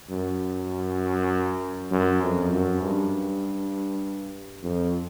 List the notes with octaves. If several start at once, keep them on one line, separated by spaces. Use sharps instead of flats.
F#2
F#2
F2
F#2
G2
F2